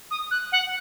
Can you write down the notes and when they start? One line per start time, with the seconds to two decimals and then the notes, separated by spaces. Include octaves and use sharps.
0.11 D#6
0.31 F#6
0.52 F#5